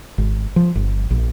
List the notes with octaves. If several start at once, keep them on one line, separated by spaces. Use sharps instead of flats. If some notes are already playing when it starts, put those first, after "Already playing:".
G#1
F3
G1
A#1